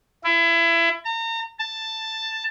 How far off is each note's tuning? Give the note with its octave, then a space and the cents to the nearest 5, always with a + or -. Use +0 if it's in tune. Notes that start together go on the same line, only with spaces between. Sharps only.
E4 +25
A#5 -35
A5 +10